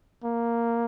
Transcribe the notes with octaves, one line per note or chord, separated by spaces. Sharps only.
A#3